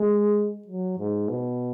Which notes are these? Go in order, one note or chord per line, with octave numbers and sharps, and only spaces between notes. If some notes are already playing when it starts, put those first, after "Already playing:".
Already playing: G#3
F#3
G#2
B2